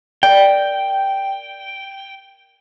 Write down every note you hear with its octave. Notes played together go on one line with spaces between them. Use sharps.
A#4 D5 G5